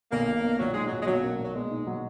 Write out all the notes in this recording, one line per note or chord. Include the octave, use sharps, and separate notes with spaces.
B1 A#3
B1
B2
A#1 F#3
G#3 D#4
A#2 F#3
G#3
B1 F#3
A#3
A#2
F#3
B2 G#3
D#4
F#3